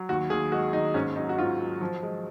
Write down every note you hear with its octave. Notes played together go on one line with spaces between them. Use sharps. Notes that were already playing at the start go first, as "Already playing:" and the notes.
Already playing: F#3
D#2 F#4
D#2 G#4
G#3 F#4
D#2 D#4
G#2 C#4
F#3 D#4
F#4
G#2 F4
F#3
F3
G#3